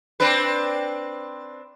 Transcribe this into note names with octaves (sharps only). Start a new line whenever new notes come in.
C4 D4 B4